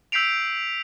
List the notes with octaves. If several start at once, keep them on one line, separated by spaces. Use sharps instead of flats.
E6 G6 B6 C7 D7 F7